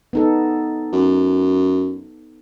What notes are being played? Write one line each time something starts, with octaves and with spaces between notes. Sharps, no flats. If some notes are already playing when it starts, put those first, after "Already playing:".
B3 D#4 A4
F#2